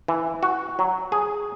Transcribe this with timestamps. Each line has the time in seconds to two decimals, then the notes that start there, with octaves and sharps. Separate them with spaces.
0.08 E3
0.43 F#4
0.79 F#3
1.12 G#4